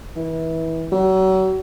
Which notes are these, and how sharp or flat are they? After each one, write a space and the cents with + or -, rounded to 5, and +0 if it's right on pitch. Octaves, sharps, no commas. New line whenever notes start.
E3 -25
F#3 +35